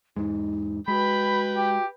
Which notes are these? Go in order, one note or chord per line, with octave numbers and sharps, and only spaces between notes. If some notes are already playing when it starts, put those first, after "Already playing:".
E2 G#2 G#3 D#4
G#3 F#4 B4 G5 B5
G4